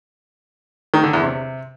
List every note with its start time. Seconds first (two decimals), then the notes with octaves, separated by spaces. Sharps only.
0.94 D#3
1.04 D3
1.13 E2
1.23 C3